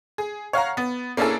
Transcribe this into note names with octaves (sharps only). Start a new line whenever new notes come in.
G#4
C#5 F5 F#5 A#5
B3
A#3 C#4 D4 E4 G#4 A4